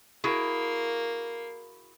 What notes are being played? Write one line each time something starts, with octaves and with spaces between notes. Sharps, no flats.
A#3 E4 F#4 G#4